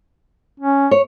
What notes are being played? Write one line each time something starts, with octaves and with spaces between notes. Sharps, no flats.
C#4
C#5